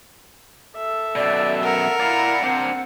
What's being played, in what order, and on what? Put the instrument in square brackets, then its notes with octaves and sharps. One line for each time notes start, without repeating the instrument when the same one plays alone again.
[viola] A4 E5
[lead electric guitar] F#2 B2 [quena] D5
[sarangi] A#4 [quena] F#5
[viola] E4 A#5 [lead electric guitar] D5 F5
[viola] C4 [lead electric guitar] D4 C5